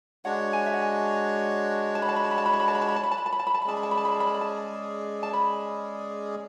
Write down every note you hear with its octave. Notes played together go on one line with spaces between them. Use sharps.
G#3 D4 F#4 C#5 F#5
G#5
E5
F#5
G#5
A5
B5
A5
B5
A5
B5
A5
B5
A5
B5
A5
B5
A5
B5
A5
B5
A5
B5
A5
B5
A5
B5
A5
B5
G#3 C#4 G#4 D5 A5
B5
A5
B5
A5
B5
A5
B5
A5
B5
A5
A5
B5